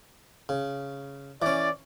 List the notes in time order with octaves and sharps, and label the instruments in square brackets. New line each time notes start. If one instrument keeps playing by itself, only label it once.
[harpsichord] C#3
[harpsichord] E3 C#4 [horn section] D5